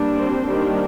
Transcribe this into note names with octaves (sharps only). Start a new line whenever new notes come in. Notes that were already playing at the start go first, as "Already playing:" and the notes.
Already playing: G3 A#3 D4
C4 C5
D#3 G3 A#3 D4